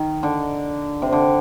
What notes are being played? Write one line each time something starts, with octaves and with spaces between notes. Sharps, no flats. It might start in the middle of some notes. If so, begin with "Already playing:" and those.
Already playing: D#3
D3
C3
D3